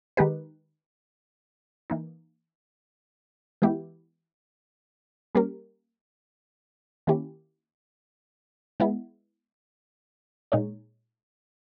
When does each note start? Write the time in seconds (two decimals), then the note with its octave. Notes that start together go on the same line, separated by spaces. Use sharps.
0.17 D#3 G#3 D#4 G4 B4
1.90 E3 A#3 D#4
3.62 E3 G#3 B3 E4 G4
5.35 G3 A#3 C#4 G4 A#4
7.07 D#3 A#3 C#4 E4 G4
8.80 G#3 B3 E4
10.52 A#2 G#3 D#4 G#4 C#5